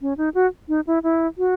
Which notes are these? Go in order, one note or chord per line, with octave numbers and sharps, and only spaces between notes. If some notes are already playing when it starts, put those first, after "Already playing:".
C#4
D#4
F#4
D#4
E4
E4
F#4